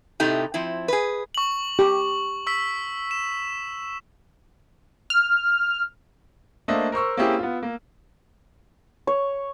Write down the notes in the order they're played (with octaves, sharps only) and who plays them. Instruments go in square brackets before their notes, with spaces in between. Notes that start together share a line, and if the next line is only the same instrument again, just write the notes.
[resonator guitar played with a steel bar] A2 C3 A3 D#4 G4
F3 C4 E4
G#4 B4
[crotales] C#6 F#7
[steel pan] G4
[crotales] C#6 E6 B6
E7
[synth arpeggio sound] F6
[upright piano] A3 A#3 D4 C5 D#5 E5
A#4 C5 C#6 E6
A#3 C4 C#4 E4 G4 G#4
B3 F4
A#3
[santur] C#5